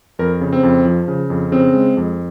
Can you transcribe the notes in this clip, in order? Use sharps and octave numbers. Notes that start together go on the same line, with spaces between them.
F2 A#4
C#3
C4
F2
F3
C#3
F2
C#3 C4
G#3
F2